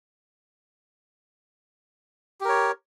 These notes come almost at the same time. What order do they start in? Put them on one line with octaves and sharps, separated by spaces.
G4 A#4 C#5